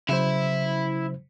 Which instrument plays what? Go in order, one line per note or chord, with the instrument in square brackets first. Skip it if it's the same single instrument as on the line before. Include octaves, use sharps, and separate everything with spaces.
[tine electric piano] C#3 F#3 C5 [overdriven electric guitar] E4 E5